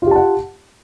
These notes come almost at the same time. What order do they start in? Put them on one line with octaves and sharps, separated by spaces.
F4 G4 A5 F#5